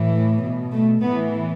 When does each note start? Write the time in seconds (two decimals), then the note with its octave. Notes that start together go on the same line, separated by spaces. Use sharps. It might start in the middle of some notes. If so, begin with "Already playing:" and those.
Already playing: A2 E3
0.42 B2
0.72 A3
1.03 A2 E3 B3